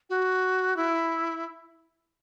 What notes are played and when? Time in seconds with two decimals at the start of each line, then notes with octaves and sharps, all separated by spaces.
0.10 F#4
0.76 E4